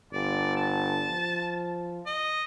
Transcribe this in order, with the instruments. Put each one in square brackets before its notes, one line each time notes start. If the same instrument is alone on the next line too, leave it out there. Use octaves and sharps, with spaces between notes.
[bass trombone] G1 [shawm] D5
[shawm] A5
[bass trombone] F3
[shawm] D#5